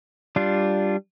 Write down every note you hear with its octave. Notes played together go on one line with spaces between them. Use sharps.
G3 D4 F4